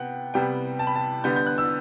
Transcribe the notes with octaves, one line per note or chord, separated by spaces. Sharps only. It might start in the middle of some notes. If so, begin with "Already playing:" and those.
Already playing: C3 B3 F#5 G5
C3 G3 B3 G5
A5
B5
A5
D3 G3 B3 G6
G6
F#6
E6